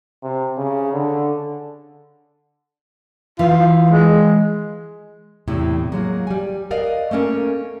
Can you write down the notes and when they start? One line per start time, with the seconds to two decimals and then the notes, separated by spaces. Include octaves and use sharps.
0.23 C3
0.58 C#3
0.93 D3
3.39 E3 F4
3.90 G#3
5.48 E2 A2 C3 E4
5.92 F#3 G#3 A#3
6.27 G3 G#5
6.71 A#4 B4 D5 D#5 F5
7.11 A3 A#3 C#4 A#4